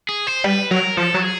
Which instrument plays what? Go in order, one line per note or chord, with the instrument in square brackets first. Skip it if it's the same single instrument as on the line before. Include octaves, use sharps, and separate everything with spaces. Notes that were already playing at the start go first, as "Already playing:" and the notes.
[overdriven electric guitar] G#4
C5
[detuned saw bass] G3 [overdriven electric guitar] B4
[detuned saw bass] F#3 [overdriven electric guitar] A#4
[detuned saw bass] F3 [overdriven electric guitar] A4
[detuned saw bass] F#3
[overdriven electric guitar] G#4